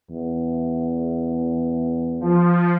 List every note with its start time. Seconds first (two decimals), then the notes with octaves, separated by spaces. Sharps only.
0.10 E2
2.20 F3